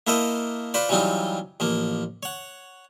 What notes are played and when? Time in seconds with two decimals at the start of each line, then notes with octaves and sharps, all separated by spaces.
0.07 A#3 E4 A4 A#4 C5 D#5
0.74 F4 B4 C5 D5
0.89 E3 F#3 G3 C4 D#4 F4
1.60 A1 F3 A#3
2.23 C#5 F#5